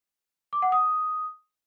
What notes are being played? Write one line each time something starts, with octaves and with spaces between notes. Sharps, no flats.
D6
F#5
D#6